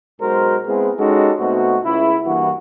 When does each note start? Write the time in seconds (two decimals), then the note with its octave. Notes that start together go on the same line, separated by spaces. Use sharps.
0.21 B1 G#3 F#4 A#4 C5
0.67 G#3 B3 C4 E4 G#4
0.99 G#3 C#4 D#4 F#4 G4 A4
1.40 B2 A3 C4 D#4 F#4
1.84 C#2 E4
2.26 G2 E3 A#3 F#4